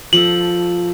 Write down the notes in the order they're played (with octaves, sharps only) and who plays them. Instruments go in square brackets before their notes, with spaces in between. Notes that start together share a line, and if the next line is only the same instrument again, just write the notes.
[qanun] F3 A4 [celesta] F#7